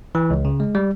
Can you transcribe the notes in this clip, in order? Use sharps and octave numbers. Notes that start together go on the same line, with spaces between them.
E3
C#2
C#3
G#3
G3